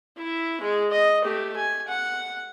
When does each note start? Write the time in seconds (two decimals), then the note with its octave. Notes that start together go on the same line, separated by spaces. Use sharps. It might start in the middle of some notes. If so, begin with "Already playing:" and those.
0.17 E4 E5
0.61 G#3 G#4
0.91 D#5
1.23 A3 G4
1.56 G#5
1.88 F#5